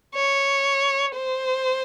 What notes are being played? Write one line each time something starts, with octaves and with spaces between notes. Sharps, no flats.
C#5
C5